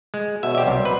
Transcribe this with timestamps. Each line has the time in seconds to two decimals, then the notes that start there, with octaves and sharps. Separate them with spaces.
0.14 G#3
0.43 B2 C#5 E5
0.55 G4 C5 D5 E5
0.67 C2 F#3
0.85 B4